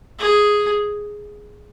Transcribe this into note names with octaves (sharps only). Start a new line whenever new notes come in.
G#4